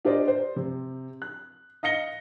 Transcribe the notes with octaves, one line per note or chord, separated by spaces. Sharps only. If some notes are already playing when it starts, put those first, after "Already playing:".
D4 G4 A#4 C5 D5 D#5
C5
C3
F#6
D#5 F5 A#6 C#7 G7